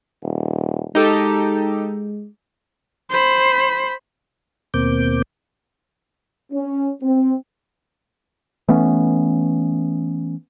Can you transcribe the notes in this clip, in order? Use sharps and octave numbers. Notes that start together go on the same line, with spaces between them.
D#1
G#3 D#4 G4 A4
C5 B5
D#2 B2 A#3 C4 D6 G6
C#4
C4
E3 A3 B3 C#4